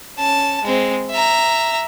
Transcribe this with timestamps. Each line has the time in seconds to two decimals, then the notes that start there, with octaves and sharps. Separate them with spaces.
0.18 C#4 A5
0.63 G#3 C4
1.10 E5 A#5